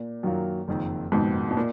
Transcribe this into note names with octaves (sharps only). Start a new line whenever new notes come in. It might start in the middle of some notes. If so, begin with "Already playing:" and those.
Already playing: A#2
F#2 D#3 F#3 A#3 F4
F#1 F2 D#3
F#1 F2 G#2 B2 D#3
B2
A#2